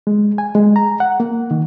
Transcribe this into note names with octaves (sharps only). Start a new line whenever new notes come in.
G#3
G#5
G#3
A#5
F#5
A#3
D#3